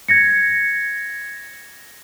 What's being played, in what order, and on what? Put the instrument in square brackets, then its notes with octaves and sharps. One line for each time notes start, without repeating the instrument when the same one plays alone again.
[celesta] G#6 A#6 C#7